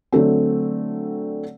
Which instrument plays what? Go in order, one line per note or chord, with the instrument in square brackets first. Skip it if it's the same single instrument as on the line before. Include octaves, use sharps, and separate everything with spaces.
[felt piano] D3 F#3 A3 C4